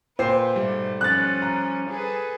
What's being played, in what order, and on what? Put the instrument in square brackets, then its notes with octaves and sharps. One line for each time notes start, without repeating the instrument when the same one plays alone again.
[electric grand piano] A#2 G5 C7 [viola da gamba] B4 [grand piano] C5
[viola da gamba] G#2 B2 A3 [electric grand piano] G3
[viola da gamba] F3 C#4 [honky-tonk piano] F#6 A6
[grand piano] A#5
[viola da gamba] G#4 A4 B4